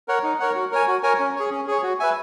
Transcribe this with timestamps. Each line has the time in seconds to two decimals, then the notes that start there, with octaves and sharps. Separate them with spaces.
0.08 A#4 C#5 F#5
0.23 D#4
0.40 A#4 C#5 F#5
0.55 F#4
0.72 A#4 C#5 G#5
0.87 F#4
1.03 A#4 C#5 G#5
1.19 C#4
1.36 G#4 C#5
1.51 C#4
1.68 G#4 C#5
1.83 F#4
2.00 B4 E5 G#5